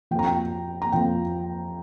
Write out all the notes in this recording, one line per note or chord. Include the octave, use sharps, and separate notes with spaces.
F2 F3 G5 A#5
G5
A#5
F2 F3 G5